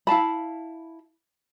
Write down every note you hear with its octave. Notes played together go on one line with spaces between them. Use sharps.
E4 F5 A5 B5